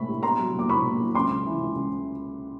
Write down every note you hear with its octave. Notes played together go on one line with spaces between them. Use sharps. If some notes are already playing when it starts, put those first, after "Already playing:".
Already playing: A2 B5 C#6
G3
B3 A#5 C6
F#3
A#2 D6
A#2 B5 C#6
A#2
F#3
C#2 C6 D6
C#2
E3
C#2
C#2